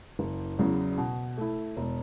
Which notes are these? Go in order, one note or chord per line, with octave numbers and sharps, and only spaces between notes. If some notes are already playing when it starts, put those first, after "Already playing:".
F#1
E2 C#3 F#3
B2
A3 E4
E1